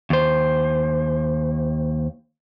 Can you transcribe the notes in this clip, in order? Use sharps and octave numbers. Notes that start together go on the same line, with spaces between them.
D#2 C5